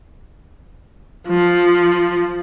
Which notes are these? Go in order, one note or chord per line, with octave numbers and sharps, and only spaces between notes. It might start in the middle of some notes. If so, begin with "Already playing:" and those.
F3